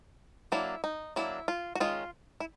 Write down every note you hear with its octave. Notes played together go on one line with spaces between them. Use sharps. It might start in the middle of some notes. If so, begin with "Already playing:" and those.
F#3 A#3 D4 E4
D#4
F#3 A#3 D4 E4
F4
F#4
D#3 G#3 C#4 F4
E4